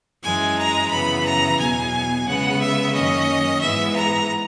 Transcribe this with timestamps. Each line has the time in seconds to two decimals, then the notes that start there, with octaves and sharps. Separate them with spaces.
0.23 F#2 E3 G#3 G#5
0.58 A#5
0.91 F#2 C#3 E3 B3 B5
1.25 A#5
1.59 E2 B2 F#3 G#5
2.27 C#3 G#3 B3 F#5
2.60 E5
2.94 F#2 D#3 A#3 C#4 D#5
3.61 G#2 E3 G#3 B3 E5
3.95 A#5